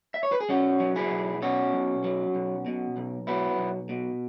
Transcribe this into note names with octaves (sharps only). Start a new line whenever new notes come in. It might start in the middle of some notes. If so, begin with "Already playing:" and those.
E5
C#5
B4
G#4
B1 C#4 F#4
F#3
E4 G#4
B1
B2 C#4 F#4
B1
F#3
B1
B2
B1
F#3 B3 E4
B1
B2